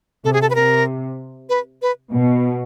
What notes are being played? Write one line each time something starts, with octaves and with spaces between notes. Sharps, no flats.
C3 A4
G#4
A4
B4
C3 A#4
B4
B4
B2